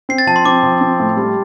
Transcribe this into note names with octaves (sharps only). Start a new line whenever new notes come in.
C4 C7
A6
F3 A5
C6
C4 D6
F3
C4
A2
G3